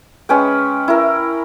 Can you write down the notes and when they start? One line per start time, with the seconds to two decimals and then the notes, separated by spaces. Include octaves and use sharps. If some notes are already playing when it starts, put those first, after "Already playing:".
0.29 G#3 C#4 B4 G5
0.88 E4 A#4